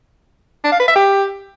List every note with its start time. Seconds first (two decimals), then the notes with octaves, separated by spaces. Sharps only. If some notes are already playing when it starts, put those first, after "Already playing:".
0.64 D4
0.72 F5
0.80 B4
0.88 E5
0.96 G4